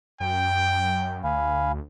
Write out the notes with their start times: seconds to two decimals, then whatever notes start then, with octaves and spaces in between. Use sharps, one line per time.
0.20 F#2 G5
1.24 D2 F5 G#5 B5